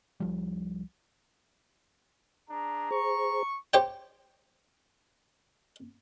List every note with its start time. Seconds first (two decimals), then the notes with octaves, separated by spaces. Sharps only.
0.20 C2 F3 G3
2.48 D4 G#4 A#5
2.91 G#4 C5 C#6
3.74 G4 C5 C#5 G5